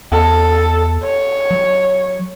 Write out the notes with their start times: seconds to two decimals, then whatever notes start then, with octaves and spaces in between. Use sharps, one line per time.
0.12 E2 A4
1.03 C#5
1.51 F#3